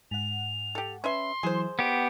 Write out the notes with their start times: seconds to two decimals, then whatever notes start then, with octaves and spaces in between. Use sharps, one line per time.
0.11 G#2 F#5 F7
0.75 G4 A4
1.04 C#4 B4 E5 C6
1.43 E3 F#3 E4 G#4 C5
1.79 B3 G4 D5 D7